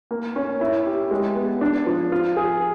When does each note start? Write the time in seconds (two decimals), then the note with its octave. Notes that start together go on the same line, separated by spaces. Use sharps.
0.11 A#3
0.36 C#4
0.61 E4
0.86 G4
1.11 G#3
1.35 B3
1.61 D4
1.86 F3
2.12 F4
2.37 G#4